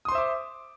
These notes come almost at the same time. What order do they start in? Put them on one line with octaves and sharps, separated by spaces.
D#6 C6 C5 E5 D6